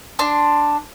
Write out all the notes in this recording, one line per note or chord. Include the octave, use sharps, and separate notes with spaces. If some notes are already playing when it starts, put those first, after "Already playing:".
D4 C6